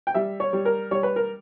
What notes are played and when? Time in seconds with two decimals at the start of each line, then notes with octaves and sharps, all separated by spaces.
0.07 G5
0.14 G3 E5
0.40 C#5
0.53 G3
0.65 A#4
0.91 G3 C#5
1.03 B4
1.16 A#4